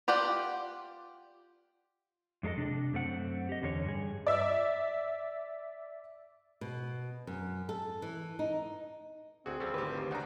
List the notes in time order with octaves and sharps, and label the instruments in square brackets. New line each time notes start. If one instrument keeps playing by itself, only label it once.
[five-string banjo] F4 G4 D5 F#5 G5
[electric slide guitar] F2 G#3 D4 A4 D#5
C3 D4
F#2 A3 C4 F#5
G4 D#5
E2 D3 C#4 D#4 C#5
G2 G#4
[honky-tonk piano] D5 E5 E6
[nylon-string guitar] B2
F#2
A4
E3
D#4
[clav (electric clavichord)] D2 F#4 [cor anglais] C4 [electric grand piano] G#4
[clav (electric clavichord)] F3 G3 C#4 [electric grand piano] A4
[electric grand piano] G#1 G4 [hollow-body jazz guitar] D2 B4
[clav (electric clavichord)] D#2 [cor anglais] A#3
[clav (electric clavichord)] C#3 D#4 [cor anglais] D4 [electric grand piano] F#5 A#5